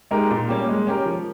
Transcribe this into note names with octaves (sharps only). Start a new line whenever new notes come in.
G#3 D#4 G4 A#4
A#2
G3 A#3 C#4 G4
G#3
C#4 G4 A#4
F3